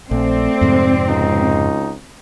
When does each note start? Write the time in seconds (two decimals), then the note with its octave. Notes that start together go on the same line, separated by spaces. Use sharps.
0.11 A#1 A3 C4 D5
0.61 F2 G#2 C3
1.08 C#2 D#4